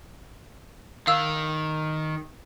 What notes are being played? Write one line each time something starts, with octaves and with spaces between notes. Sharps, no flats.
D#3 F5 E6